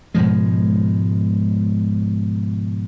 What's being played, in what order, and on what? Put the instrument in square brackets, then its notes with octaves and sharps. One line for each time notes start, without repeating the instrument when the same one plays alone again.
[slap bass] G#2 B2 F3 G#3